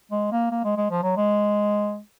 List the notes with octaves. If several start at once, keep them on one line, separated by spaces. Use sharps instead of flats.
G#3
A#3
A#3
G#3
G#3
F3
F#3
G#3